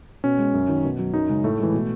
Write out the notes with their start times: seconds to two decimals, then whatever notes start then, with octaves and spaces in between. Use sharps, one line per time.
0.24 B2 C#4
0.39 G#3
0.54 F#2
0.69 D#3 F#3
0.84 B2
0.99 F#3
1.14 F#2 D#4
1.29 C#3 G#3
1.44 A2 A3
1.60 E3 G#3
1.74 B2